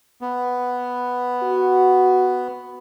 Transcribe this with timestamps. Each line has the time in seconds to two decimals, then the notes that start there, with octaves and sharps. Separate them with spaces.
0.21 B3
1.43 F#4